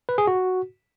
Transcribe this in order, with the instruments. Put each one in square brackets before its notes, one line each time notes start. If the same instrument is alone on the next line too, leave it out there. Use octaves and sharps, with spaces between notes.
[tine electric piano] B4
G#4
F#4